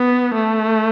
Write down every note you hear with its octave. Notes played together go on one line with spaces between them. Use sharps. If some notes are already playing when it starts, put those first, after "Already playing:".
Already playing: B3
A3